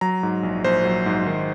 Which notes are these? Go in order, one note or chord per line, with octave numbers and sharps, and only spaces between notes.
F#3 A#5
G#2
A#1
A#1 C5
F#3
G#2
D#3